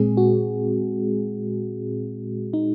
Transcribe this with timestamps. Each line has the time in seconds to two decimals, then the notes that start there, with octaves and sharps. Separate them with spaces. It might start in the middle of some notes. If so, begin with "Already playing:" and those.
Already playing: A#2 G#3 C4 G#4
0.17 F#4
2.53 D#4